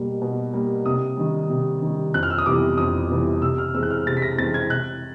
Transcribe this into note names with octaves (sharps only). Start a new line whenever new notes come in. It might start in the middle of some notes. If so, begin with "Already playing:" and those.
Already playing: B2 G3 A#3
B2
G3 A#3
C3 D#6
D#3 G3
C3
D#3 G3
F2 F#6
F6
E6
D#6
C3 E3 G3 B3 D6
F2 D#6
C3 E3 G3 B3
C3 E6
F6
E3 G#3 C4 E6
F#6
F6
C3 A6
B6
A#6
E3 G#3 C4 A6
G#6
C3 F#6